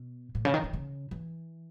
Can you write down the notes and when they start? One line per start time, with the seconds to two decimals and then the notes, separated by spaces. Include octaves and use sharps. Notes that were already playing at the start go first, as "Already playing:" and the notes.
Already playing: B2
0.35 A2
0.45 C#3
0.54 D#3
0.64 E3
0.73 C#3
1.11 E3